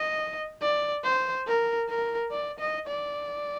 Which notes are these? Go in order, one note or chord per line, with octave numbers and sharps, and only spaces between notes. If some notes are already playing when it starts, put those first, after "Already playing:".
Already playing: D#5
D5
C5
A#4
A#4
D5
D#5
D5